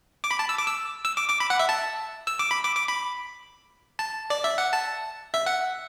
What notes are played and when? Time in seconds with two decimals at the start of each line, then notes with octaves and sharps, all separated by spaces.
0.24 D6
0.31 B5
0.39 A5
0.49 E6
0.58 D6
0.67 E6
1.05 E6
1.17 D6
1.29 D6
1.40 B5
1.50 F#5
1.59 E5
1.69 A5
2.27 E6
2.39 D6
2.51 B5
2.64 D6
2.76 D6
2.88 B5
3.99 A5
4.30 D5
4.44 E5
4.58 F#5
4.73 A5
5.34 E5
5.46 F#5